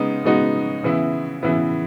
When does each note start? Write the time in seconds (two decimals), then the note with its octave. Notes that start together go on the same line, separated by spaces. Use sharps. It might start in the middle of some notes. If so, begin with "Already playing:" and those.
Already playing: C#3 G#3 B3 D#4
0.24 C#3 G#3 B3 D#4 F#4
0.83 C#3 E3 B3 E4
1.43 C#3 E3 B3 E4